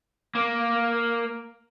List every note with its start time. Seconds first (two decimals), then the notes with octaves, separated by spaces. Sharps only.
0.35 A#3